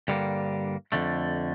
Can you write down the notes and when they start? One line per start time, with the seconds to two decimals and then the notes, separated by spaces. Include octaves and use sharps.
0.08 G2 D3 G3 A#3
0.92 F2 D3 A3